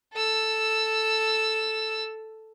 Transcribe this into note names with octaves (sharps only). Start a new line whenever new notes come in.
A4 E6